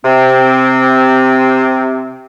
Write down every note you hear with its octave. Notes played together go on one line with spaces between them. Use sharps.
C3 C4